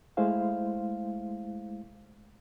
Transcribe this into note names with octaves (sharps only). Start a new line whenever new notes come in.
G#3 A3 E4 C5 F5